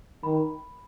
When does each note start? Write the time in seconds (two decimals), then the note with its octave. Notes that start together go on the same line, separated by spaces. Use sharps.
0.23 D#3 B5